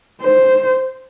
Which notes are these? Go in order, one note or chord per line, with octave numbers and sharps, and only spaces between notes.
C5